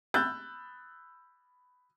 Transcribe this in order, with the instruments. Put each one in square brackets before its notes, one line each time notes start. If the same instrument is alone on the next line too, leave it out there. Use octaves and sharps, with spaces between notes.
[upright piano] B5 E6 F#6 G6 A6